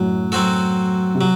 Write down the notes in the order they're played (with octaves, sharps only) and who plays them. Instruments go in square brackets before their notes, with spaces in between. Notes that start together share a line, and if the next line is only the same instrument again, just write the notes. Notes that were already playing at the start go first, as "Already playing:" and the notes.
Already playing: [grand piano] F#2 A2 [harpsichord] F#3
[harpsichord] F#3 C4 F#4 A4
[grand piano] C3
[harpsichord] F#3